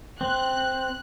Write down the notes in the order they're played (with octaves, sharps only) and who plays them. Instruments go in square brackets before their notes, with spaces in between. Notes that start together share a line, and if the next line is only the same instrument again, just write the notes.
[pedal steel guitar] C4 [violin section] F#6